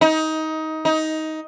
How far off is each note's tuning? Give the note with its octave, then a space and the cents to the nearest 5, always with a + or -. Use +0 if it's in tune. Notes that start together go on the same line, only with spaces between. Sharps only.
D#4 +20
D#4 +15